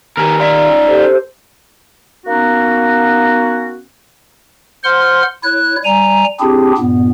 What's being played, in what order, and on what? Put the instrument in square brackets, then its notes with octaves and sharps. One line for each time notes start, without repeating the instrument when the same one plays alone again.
[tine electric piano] D#2 D#3 [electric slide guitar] A#4 B4 G#5
[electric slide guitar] D#4 F4 E5 [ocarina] D5
[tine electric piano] C#4
[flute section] G4 A4 C5
[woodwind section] A#3 B3 C#4 D#4 F#4
[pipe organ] C5 F#5 C6 F6
E4 C#5 F#6
G3 G#5 A#5
C4 D4 E4 G4 G#4
G2 A#2 B3